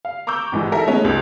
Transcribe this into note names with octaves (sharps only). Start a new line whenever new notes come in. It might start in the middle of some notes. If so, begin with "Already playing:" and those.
F5
A#5 C#6 D6 E6 G6
G#1 G#2 E3 G3
A4 A#4 E5
G#3 A3 B3 C#4 D#4
C#2